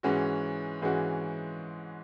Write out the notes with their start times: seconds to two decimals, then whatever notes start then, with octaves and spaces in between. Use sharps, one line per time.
0.03 G#2 E3 G#3 C#4 F#4
0.82 G#2 E3 G#3 C#4 F#4